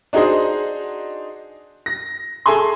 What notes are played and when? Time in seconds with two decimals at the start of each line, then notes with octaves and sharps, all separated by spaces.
0.13 D4 D#4 F#4 G#4 C5 D#5
1.86 A#6
2.46 G#4 A4 E5 G#5 C6